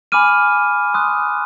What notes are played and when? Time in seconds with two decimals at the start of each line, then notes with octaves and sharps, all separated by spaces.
0.12 G#5 B5 D6 F6 D#7
0.94 C6 D#6 F#6